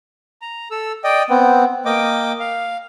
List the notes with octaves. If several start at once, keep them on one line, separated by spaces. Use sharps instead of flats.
A#5
A4 E6
D5 D#5 G5
B3 C4
A#3 D#5 G5 D6
F5